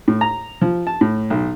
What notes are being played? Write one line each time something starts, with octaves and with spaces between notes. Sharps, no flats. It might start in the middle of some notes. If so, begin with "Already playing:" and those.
A2
A#5
F3
A5
A2
B1